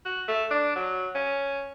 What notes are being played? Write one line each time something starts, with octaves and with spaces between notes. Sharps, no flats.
F#4
A3
D4
F#3
C#4